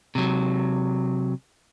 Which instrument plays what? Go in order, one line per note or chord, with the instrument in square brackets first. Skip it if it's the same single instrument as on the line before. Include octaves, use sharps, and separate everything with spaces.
[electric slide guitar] C3 F#3